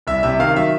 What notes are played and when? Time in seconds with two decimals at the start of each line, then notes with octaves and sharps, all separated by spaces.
0.07 C2 E5
0.23 C3 E5
0.40 D#3 F5
0.56 F#3 E5